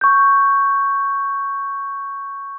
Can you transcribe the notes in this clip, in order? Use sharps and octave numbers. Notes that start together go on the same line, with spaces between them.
C#6 G6